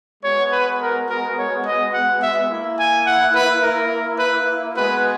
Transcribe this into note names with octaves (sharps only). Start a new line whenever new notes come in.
G#3 B3 F#4 C#5
B4
A#4
A#4
C#5
D#5
F#5
E5
A#3 E4
G#5
F#5
B4
A#4
B4
G#3 B3 F#4 B4